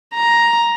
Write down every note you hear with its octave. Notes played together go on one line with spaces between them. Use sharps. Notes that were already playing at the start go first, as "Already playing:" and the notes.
A#5